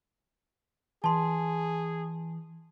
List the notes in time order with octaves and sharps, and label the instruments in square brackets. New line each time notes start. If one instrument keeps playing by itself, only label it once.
[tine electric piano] E3 [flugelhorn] G#4 [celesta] A5 C6